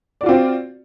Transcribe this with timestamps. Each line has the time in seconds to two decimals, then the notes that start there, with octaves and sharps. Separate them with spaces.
0.21 D5
0.23 F#4
0.26 F4
0.29 C4